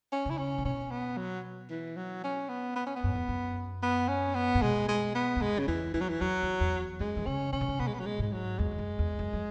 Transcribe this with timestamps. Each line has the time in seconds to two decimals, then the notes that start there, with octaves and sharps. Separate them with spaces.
0.12 C#4
0.26 C#3 E4
0.38 C#4
0.58 C#3
0.65 B2 C#4
0.91 B3
1.17 F#3
1.70 E3
1.97 F#3
2.24 C#4
2.49 B3
2.76 B3
2.86 C#4
2.96 B3
3.04 F#2
3.15 E2
3.29 F#2
3.83 B3
4.09 C#4
4.35 B3
4.55 G#2
4.62 B2 G#3
4.88 G#3
5.15 B3
5.36 E2
5.41 F#2 G#3
5.59 C#3
5.68 E2 E3
5.94 E2 E3
6.01 F#3
6.09 E3
6.21 E2 F#3
6.43 E2
6.60 E2
7.00 F#2 G#3
7.17 E3
7.26 C#3 C#4
7.53 C#3 C#4
7.61 B2
7.68 C#3
7.79 B2 B3
7.87 G#3
7.94 B3
8.00 F#3
8.06 G#3
8.19 G#2 G#3
8.33 F#3
8.59 E2 G#3
8.72 E2
8.78 F#2
8.99 E2
9.19 F#2
9.33 F#3